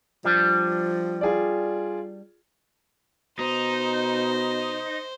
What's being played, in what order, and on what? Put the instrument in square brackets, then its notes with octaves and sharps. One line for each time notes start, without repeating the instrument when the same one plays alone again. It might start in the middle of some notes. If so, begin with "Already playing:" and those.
[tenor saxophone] F3 [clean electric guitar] G3 D4
[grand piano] F4 G#4 D5
[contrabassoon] B2 [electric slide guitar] D#4 [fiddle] C5